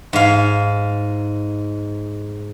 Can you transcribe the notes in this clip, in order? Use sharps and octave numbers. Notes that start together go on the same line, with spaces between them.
G#2 F5